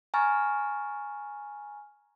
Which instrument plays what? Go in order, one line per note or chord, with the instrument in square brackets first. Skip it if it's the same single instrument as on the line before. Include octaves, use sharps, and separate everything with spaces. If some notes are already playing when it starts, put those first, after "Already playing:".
[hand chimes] G#5 A#5 C#6 F6 A6